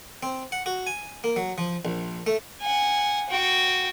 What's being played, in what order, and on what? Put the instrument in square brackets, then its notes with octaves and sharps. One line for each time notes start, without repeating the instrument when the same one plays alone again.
[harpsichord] C4
F#5
F#4
G#5
A#3
F#3
F3
A#1
A3
[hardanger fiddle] F#5 G#5
F#4 G5